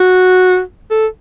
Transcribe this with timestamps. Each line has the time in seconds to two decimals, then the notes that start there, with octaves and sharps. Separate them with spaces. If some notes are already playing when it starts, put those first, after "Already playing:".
Already playing: F#4
0.91 A4